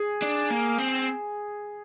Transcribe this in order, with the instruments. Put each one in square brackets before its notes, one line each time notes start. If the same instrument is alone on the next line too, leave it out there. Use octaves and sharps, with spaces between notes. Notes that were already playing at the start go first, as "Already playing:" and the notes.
Already playing: [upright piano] G#4
[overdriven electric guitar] D4
A#3
C4